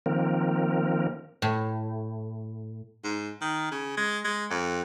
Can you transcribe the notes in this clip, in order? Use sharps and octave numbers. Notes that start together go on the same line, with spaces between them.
D#3 F3 A#3 C4 A#4
A2
G#2
D#3
C#3
G#3
G#3
F2